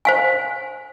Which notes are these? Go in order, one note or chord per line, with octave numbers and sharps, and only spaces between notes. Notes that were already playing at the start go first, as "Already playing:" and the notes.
C5 F5 G#5